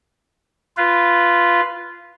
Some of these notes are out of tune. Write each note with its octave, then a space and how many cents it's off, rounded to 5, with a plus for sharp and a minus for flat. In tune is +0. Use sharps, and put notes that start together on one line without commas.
F4 -10 B4 +0